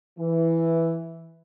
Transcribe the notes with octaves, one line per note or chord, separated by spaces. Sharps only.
E3